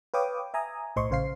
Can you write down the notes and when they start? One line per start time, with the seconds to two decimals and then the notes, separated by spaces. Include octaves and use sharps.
0.14 B4 C#5 F5 G5 D6 D#6
0.54 E5 G#5 A#5 D#6
0.96 B1 A2 C5 D#5 C6 C#6
1.10 A#1 C#3 C5 F5 C7